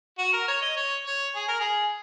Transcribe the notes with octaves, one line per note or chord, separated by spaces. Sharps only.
F#4
A#4
C#5
D#5
C#5
C#5
G#4
A#4
G#4